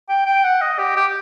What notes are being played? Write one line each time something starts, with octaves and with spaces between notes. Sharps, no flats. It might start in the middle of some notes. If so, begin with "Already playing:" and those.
G5
G5
F#5
D#5
G4
G4